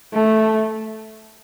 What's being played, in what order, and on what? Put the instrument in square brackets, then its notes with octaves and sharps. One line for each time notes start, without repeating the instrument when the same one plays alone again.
[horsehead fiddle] A3